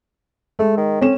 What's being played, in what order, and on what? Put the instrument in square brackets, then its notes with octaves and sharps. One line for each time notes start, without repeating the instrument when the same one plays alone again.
[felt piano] G#3 [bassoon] A3
[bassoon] D#3
[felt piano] C4 A4 E7 [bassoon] C#4